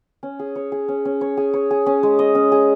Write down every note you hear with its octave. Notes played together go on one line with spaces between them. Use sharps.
C#4
G#4
C#5
G#4
C#4
C#4
C#5
G#4
C#5
G#4
C#4
G#3
D#5
C#4
G#4